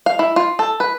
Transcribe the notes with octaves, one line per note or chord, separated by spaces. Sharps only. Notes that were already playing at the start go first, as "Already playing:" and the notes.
F5
E4
F4
A4
B4